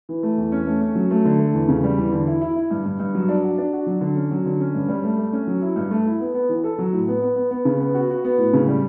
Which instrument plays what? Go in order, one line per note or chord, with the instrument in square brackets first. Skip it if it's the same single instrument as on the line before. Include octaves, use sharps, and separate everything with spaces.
[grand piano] E3
A3
E2
C#4
A3
C#4
F#3
A3
D3
A3
E2
C#3
G3
E2
D3
E4
E4
E4
G2
G2
G2
F#3
D4
F#4
D4
F#4
F#3
D3
C#4
F#3
D3
C#4
G2
G3
A3
A3
C#4
F#3
E4
G2
A3
E4
B3
B3
E3
A4
F#3
A2
B3
B3
B3
B3
C#3
B3
F#4
F#4
B3
A2
C#3
G3